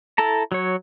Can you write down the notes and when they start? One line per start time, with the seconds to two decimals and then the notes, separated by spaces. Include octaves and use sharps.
0.18 E4 A4 A5 A#5
0.52 F#3 C#5